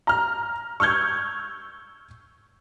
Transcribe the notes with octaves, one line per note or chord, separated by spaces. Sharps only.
A#5 F6
C#6 E6 F6 G6 G#6